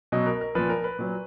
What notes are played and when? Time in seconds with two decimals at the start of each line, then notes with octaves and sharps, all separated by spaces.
0.12 B2 F#3 D#5
0.26 A#4
0.41 A#4
0.55 A#2 F3 B4
0.69 A#4
0.84 B4
0.99 A#2 F#3